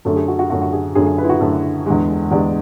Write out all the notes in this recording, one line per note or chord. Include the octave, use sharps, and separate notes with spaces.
F#2 D3 A3 A4
G#4
F#4
F#4
F#2 D3 A3 F#4
F#4
G#4
F#2 D3 A3 G#4
G#4
B4
E4
F#4
F#2 D3 A3 A4
E2 D3 G#3
E2 D3 G#3 D5